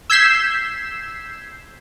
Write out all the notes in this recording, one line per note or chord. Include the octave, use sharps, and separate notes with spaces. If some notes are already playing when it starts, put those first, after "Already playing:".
E6 G6 G#6 B6 C7 E7